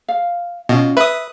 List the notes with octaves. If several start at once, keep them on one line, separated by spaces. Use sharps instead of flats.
F5
B2 C#4 F4 D#5
B4 E5 D#6